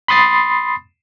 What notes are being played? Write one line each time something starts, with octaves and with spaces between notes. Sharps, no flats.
B5 C6 D#6 A6 C7